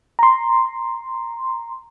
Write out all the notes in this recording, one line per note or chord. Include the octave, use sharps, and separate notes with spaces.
A#5 C6